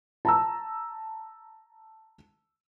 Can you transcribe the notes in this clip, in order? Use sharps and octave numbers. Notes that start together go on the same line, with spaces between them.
A5 A#5 E6